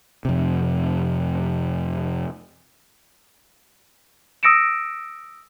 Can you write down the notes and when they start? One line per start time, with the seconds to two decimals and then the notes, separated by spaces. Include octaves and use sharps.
0.25 F2 C3
4.43 D#6 E6 A#6 C#7 D7 E7